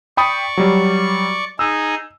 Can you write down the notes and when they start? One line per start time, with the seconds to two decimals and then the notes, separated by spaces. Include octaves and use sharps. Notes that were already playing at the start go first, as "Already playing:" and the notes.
0.17 D5 G5 B5 C#6 D#6
0.57 F#3 G3
1.59 D#4 G#4 E6